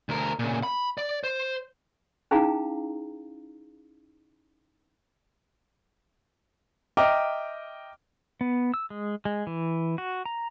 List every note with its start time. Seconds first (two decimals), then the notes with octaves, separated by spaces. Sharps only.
0.09 D2 A#4
0.39 A#2 C#3
0.63 B5
0.98 D5
1.24 C5
2.31 C#4 D#4 E4 G#4 F5 A#5
6.97 D#5 E5 G5 A#5 D6 F6
8.41 B3
8.74 E6
8.90 G#3
9.25 G#3
9.47 E3
9.98 F#4
10.26 A#5